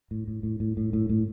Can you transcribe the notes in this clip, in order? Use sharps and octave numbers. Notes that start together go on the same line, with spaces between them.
A2
A2
A2
A2
A2
A2
A2